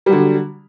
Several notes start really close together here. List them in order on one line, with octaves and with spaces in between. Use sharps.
G3 F#3 D3